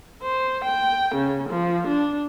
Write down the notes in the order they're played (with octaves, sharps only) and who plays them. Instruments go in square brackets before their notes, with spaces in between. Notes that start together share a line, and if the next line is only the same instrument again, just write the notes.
[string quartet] C5
G5
C#3
F3
D4